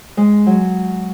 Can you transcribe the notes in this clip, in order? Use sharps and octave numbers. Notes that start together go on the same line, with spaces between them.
G#3
F#3